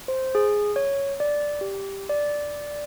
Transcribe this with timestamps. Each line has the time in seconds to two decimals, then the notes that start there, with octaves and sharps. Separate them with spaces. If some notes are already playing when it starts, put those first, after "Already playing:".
0.08 C5
0.35 G#4
0.76 C#5
1.20 D5
1.61 G4
2.09 D5